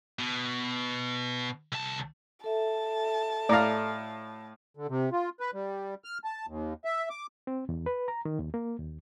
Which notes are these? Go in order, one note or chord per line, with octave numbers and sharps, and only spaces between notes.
B2
C2 A5
A4 E5 A5
A2 D5 F5 A#5
D3
C3
F4
B4
G3
F6
A5
D#2
E5
D6
C4
E2
B4
A#5
D#3
D#2
A#3
D#2